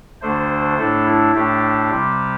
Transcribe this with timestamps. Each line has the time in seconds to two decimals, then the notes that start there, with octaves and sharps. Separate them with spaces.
0.22 D2 D3 A3 D4 C5
0.78 A2 A3 D4 A4
1.06 E4
1.34 A2 A3 D4 G4
1.90 C3 G3 C4